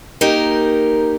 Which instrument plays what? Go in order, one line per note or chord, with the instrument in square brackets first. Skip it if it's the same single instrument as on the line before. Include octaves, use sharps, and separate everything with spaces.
[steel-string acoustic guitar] A#3 D#4 G4 A#4